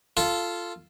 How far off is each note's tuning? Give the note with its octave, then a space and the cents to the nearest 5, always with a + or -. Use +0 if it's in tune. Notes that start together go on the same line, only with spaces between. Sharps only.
F4 -10 A4 +0